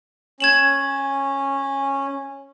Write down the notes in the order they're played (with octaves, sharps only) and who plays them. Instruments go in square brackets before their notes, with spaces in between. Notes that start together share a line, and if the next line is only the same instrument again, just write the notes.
[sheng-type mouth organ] C#4 [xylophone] G#6 E7 F#7